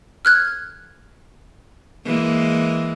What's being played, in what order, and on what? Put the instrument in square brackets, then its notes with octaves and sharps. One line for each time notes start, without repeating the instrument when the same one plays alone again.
[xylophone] F6 F#6 G#6
[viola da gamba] E3 G#3 A#3